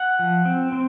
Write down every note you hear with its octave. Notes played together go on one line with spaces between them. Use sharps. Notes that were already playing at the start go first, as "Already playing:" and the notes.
Already playing: F#5
F3
C4
C4